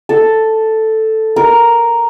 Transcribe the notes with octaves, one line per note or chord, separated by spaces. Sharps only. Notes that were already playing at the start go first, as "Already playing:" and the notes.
A4
A#4